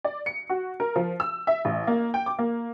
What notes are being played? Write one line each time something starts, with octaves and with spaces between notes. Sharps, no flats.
D5
C#7
F#4
A#4
F3
E6
E5
A1
A#3
G5
D6
A#3